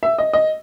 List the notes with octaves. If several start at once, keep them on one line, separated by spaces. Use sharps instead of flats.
E5
D#5
D#5